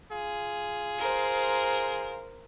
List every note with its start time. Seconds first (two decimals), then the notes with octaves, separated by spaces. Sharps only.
0.12 F4 G#4
0.98 A#4 C5